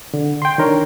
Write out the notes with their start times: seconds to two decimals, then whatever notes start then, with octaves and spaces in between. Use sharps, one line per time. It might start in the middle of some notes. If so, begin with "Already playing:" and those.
0.14 D3
0.42 G5 C6
0.58 D#3 D4 A#4 C#5